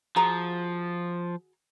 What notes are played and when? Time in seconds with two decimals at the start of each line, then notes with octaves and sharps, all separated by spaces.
0.16 F3 F#4 G#4 A#5